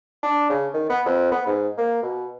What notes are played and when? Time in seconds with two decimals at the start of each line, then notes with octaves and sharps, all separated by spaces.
0.23 D4
0.50 C#3
0.74 D#3
0.90 B3
1.06 F2
1.31 B3
1.46 G#2
1.78 A#3
2.03 B2